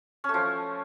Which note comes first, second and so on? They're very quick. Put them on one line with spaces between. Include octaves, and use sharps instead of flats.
C#4 A3 F3